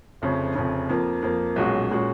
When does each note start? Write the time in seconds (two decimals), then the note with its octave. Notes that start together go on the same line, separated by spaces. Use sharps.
0.22 F1 F2 C#3
0.55 F1 F2 C#3
0.89 F2 F3 A#3
1.23 F2 F3 A#3
1.56 B1 A#2 G#3 C#4 F#4
1.91 A#2 G#3 C#4 F#4